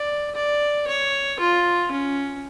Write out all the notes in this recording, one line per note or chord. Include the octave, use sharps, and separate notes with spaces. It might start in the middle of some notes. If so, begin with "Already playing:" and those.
Already playing: D5
D5
C#5
F4
C#4